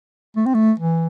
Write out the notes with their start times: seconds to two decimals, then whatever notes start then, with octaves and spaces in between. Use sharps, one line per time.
0.36 A3
0.45 C4
0.54 A3
0.79 E3